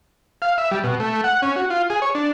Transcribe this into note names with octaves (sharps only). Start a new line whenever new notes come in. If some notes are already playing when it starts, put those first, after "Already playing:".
F5
E5
G3
B2
A3
F#5
C#4
F#4
F4
G#4
C#5
D4